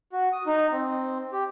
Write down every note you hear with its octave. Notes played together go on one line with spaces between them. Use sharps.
F#4
D#6
D#4
C4
G4